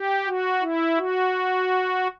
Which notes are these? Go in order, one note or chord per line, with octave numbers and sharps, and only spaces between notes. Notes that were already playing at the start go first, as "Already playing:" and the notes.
Already playing: G4
F#4
E4
F#4